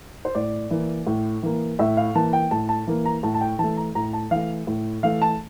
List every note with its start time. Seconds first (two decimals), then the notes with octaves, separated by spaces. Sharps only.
0.25 C5
0.35 A2 D5
0.71 E3 A#3
1.07 A2
1.43 E3 A#3
1.79 A2 E5
1.97 F5
2.15 E3 A#3 A5
2.33 G5
2.51 A2 A5
2.69 A5
2.87 E3 A#3
3.05 A#5
3.23 A2 A5
3.34 A5
3.41 G5
3.58 E3 A3 A5
3.77 A#5
3.95 A2 A#5
4.13 A5
4.31 E3 A3 F5
4.67 A2
5.03 E3 A3 F5
5.22 A5